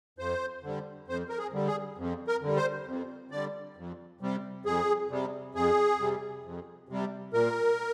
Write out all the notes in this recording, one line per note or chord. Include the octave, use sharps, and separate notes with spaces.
F2 C5
D3 G3
F2 C5
A#4
G#4
D3 G3
G#4
F2
A#4
D3 G3
C5
F2
D3 G3 D5
F2
C3 G3
F2 G#4
C3 G3
F2 G#4
C3 G3
F2
C3 G3
A#2 A#4